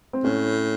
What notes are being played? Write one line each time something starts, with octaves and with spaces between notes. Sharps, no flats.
C4
A2 C#4